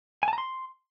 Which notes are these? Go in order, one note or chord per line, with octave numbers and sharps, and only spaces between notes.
G#5
A5
A#5
C6